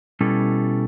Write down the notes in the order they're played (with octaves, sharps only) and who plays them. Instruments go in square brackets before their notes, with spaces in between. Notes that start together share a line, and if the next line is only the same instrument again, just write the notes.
[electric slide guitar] B2 G3 C#4 E4 A4